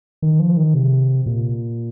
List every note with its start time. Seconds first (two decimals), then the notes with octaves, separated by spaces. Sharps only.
0.22 D#3
0.39 F3
0.57 D#3
0.74 C3
1.26 A#2